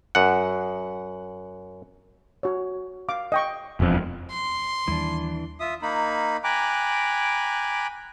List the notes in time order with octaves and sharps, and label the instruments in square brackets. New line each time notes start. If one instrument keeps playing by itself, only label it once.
[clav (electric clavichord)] F#2 F#5
[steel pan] F#4 C#5
F5 D6
D#5 G5 C#6
[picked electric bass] E1 F2
[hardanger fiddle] C6
[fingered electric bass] D#2 D#3 G3 [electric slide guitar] E3 D4
[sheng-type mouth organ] F4 E5 D#6
A#3 D#4 B5
G5 G#5 A#5 B5 D6 F#6